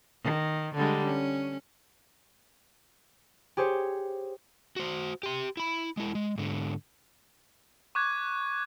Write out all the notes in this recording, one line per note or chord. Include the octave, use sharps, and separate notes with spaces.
D#3
D3 G3 G#3
C#4
G4 G#4 C5 C#5
F#4 C5
G4 C6
E4 B5
G#3 E4
G#3
G#2 D3
C#6 D6 F#6 G#6